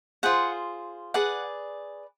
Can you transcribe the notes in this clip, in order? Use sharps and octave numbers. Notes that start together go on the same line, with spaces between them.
F4 G#4 C5 F#5
G#4 B4 D5 F#5